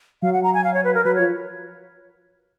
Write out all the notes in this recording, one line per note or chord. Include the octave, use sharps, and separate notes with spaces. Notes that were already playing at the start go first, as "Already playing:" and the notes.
F#3 F5
F#5
A#5
G#5
F5
C#5
B4
A#4
F#3 B4
F3 C#5